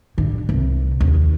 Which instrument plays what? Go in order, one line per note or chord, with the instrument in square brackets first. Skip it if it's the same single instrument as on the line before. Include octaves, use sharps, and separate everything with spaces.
[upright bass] A1 D3
C2
D#2